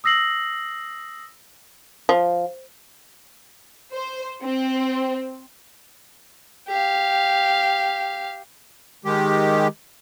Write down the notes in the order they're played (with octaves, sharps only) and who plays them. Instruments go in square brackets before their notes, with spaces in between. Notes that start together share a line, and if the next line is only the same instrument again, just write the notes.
[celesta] D#6 E6 A#6 C7 F#7
[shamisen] F3
[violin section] C5
C4
[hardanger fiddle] G4 F5
[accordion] D#3 G#3 G4